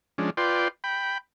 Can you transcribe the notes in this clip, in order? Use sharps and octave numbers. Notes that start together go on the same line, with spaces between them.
F3 G#3 C#4 D4
F4 B4 D5 G5 C6
G5 B5